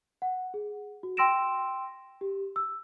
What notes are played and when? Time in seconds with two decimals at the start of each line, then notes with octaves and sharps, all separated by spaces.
0.22 F#5
0.54 G#4
1.03 F#4
1.17 G5 C6 E6 A#6 D7 E7
2.21 G4
2.56 E6